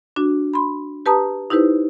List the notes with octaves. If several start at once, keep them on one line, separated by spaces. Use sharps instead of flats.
D4 F#4
B5 C6
G4 B4 A5 A#5 D#6
D#4 E4 G4 B4 C5